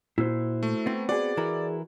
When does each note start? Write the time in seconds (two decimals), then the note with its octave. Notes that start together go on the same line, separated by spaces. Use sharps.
0.18 A#2 E4 F#4 C5
0.63 A3
0.86 B3 C4
1.09 F#4 G#4 D5
1.37 E3 E4 A#4